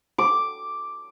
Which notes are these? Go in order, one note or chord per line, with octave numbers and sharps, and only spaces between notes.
D6